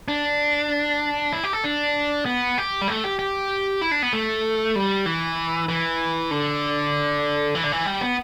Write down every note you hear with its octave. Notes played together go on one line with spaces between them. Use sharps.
D4
E4
G4
A4
D4
B3
G4
G3
A3
G4
G4
E4
D4
B3
A3
G3
E3
E3
D3
E3
D3
E3
G3
B3